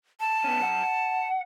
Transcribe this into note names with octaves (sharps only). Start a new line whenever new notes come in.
A5
B3 C#4
F#2 F#5
F#5